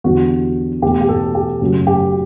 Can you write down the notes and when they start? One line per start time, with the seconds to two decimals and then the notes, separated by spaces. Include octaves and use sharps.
0.04 E2 D3 G3 F#4
0.82 E2 B2 A3 G4
1.01 G4
1.08 A4
1.35 G4
1.61 F#1 F#2 F#3 A3
1.87 G4